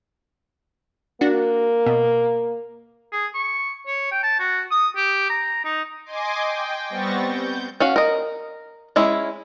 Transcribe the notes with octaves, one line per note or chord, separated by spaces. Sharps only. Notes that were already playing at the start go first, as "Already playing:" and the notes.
A#3 D4 F#4
B2
G#4
C#6
C#5
G5
A5
F#4
D#6
G4
A#5
D#4
D#5 G#5 C6 D6
G5
G3 B3 C4 C#6 A6 A#6
G6
C#4 F#4 F5
A#4 D#5
G#3 C#4 E4